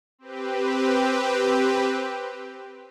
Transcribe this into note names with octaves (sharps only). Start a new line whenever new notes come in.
C4 G4 B4